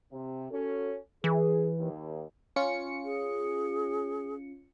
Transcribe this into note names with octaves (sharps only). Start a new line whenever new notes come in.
C3
C#4 F#4 A4
E3 G#4
D#2
C#4 F4 C#7
G#4